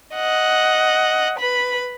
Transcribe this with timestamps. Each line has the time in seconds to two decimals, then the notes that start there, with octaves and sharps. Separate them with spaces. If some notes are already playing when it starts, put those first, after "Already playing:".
0.15 D#5 F#5
1.38 B4 B5